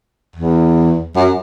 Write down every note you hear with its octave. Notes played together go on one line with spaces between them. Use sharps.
E2
F#2